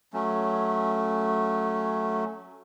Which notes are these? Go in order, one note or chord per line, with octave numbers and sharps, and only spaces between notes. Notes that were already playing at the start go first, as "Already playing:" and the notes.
F#3 A3 C#4